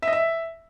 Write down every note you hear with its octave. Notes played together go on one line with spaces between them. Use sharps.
E5
D#5
E5